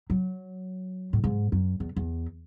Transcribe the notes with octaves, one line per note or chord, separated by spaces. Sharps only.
F#3
A2
G#2
F#2
E2
E2